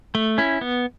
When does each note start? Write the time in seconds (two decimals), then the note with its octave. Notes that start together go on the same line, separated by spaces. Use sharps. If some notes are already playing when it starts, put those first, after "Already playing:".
0.15 A3
0.38 C#4 E4
0.61 B3